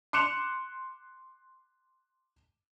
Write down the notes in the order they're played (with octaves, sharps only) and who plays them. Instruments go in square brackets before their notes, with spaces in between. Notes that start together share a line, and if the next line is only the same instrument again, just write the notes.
[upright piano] C6 D6 F#6 C#7 E7 F7